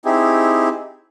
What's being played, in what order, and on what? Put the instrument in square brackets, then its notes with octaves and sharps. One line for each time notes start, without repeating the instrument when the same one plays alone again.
[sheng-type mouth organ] C4 D#4 E4 G4 G#4